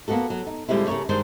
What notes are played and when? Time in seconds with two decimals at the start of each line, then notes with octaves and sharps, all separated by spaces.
0.08 A#3 B3 D4 F#4 A4
0.30 F#3
0.47 D#4
0.68 A#2 D3 G3 G#3 C4 E4
0.88 C#3 A3 A#4 C#5
1.09 G2 D#3 G#3 D4 C5